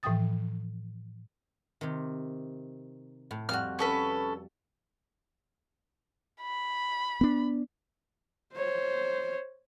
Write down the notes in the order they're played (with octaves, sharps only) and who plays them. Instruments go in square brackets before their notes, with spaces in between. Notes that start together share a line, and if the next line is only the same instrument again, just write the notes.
[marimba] A2 E3 F3 G5 D#6 A6
[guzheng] C3 D#3
A2
[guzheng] F2 G3 F#4 [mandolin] F6
[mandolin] C#4 A4 B4
[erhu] B5
[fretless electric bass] B3 D4
[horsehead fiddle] C5 C#5